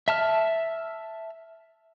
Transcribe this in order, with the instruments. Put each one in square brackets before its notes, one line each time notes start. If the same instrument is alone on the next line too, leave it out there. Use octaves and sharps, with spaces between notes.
[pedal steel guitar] E5 A5 F6